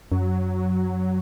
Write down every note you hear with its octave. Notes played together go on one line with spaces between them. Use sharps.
F#2 F#3